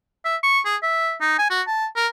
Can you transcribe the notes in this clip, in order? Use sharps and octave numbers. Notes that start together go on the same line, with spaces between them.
E5
C#6
G#4
E5
D#4
G#5
F#4
A5
A#4